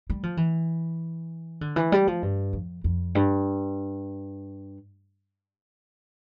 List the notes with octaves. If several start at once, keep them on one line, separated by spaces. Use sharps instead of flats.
G3
F3
E3
D3
E3
G3
F3
G2
F2
F2
G2